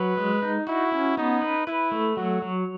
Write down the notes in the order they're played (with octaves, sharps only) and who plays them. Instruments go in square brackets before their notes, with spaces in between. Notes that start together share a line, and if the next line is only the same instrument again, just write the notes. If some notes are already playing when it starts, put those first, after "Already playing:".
Already playing: [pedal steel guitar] F#3 [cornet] B4
[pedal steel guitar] G#3
D#4
[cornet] E4 [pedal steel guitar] F#4
[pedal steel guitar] C#4
[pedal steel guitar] B3 [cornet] D#4
[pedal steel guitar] B4
[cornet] E4 [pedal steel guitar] B4
[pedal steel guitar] A3
[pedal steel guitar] F#3 [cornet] F#4
[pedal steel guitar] F#3